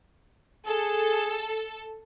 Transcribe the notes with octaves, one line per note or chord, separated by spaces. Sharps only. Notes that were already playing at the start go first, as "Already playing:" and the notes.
G#4 A4